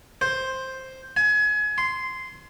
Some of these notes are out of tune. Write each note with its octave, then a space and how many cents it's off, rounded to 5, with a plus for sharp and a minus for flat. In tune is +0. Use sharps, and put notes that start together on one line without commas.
C5 +5
G#5 +30
C6 -10